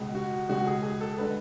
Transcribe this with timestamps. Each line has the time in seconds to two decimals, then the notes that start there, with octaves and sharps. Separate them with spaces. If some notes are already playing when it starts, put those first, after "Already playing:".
Already playing: C#2 B2 G#3
0.15 F#4
0.49 C#2 B2 G#3 F#4
0.67 G#4
0.83 G#4
1.01 A4
1.18 D3 G#3 B4